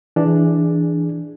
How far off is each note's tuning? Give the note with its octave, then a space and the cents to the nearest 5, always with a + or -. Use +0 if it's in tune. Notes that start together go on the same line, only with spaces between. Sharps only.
E3 +0 D4 +0 G#4 +0